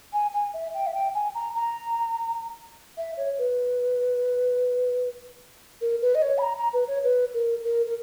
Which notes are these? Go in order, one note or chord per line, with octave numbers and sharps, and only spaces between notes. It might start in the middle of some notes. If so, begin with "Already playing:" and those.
G#5
G#5
E5
G5
E5
G5
G#5
A#5
A#5
E5
C#5
B4
A#4
B4
D#5
C#5
B5
A#5
A#5
B4
C#5
B4
A#4
A#4
A#4